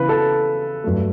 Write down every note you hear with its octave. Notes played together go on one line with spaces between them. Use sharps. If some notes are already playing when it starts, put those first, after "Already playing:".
Already playing: C#3 E3 B3 E4 B4
A4
G2 F#3 A3